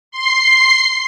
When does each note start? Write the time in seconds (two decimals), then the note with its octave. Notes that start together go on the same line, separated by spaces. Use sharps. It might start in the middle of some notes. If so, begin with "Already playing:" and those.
0.11 C6 C7